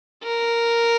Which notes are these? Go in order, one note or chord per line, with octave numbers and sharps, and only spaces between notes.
A#4